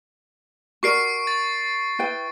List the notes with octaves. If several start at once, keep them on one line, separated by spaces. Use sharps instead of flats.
F#4 A#4 D5 C#6 C7 D7
A6
E4 B4 G5